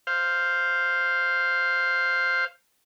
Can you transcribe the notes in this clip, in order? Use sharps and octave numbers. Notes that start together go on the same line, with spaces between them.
C5 F5